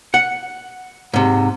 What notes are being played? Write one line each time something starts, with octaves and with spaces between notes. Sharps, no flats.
F#5
G#2 C3